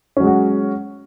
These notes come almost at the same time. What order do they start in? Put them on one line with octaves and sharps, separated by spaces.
C#4 F#3 G#3 F#4